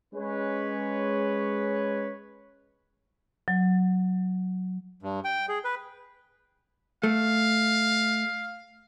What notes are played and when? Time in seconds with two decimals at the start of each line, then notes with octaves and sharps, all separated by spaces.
0.14 G#3 C#4 B4 C#5
3.48 F#3
5.02 G2
5.24 G5
5.49 G#4
5.64 B4
7.03 A3 F5